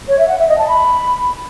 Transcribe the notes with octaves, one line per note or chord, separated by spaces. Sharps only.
C#5
E5
F#5
E5
D#5
A5
B5